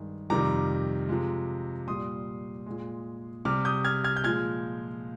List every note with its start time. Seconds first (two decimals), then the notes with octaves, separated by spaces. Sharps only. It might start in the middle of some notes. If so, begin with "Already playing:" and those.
Already playing: G2 D#3 G#3
0.30 F2 C3 D#3 G3 A#5 D6
1.09 C3 F3 G#3
1.87 A#2 G3 C6 D#6
2.66 A#2 G#3
3.45 C3 G3 D6 F6
3.65 D#6 G6
3.85 F6 G#6
4.04 F6 G#6
4.17 G6
4.24 A#2 F3 G#3 F6 G#6